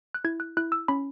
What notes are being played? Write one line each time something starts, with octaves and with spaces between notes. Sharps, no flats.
F#6
E4 G#6
F#6
E4 F#6
E6
C#4 B5